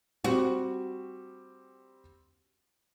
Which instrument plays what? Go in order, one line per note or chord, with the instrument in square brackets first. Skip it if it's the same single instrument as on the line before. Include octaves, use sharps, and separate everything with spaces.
[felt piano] G3 C4 [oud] F#4